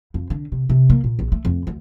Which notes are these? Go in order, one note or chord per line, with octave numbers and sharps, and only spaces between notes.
F2
D3
C3
C3
A#3
A#2
A#1
A3
F2
D2